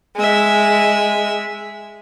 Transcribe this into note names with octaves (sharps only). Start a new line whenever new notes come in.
G#3 E5